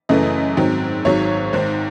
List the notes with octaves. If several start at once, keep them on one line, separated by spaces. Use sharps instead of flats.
F#2 C#3 E3 A3 D#5
G#2 D#3 F#3 C4
G#1 G#2 F#3 C#5
G#1 G#2 D#3 C5